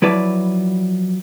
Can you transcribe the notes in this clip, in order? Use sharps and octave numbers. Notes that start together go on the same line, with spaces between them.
F3 F#3 E4 B4 D5